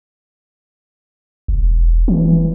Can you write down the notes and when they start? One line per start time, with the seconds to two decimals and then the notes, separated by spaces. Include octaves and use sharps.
1.48 E1
2.08 E3